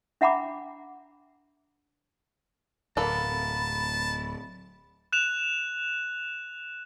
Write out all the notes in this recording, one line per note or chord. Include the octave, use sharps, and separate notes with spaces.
D4 E5 F#5 A#5 B5 D6
D1 A#3 B3 A4 A5 B5
F#6 E7 F7